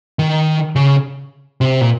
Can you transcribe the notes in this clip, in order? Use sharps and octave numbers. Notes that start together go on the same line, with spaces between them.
D#3
C#3
C3
A#2